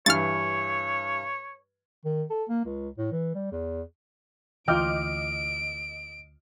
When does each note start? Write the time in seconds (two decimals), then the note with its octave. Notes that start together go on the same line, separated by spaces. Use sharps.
0.06 G2 E3 C#5 F6 A6
2.05 D#3
2.30 A4
2.49 A#3
2.65 C#2
2.98 A2
3.12 E3
3.35 G3
3.52 E2
4.68 D2 E3 F4 D#5 G5 D6 F6 D7